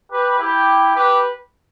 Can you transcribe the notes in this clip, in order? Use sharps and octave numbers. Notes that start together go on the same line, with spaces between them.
G4 B4
E4 G4
G4 B4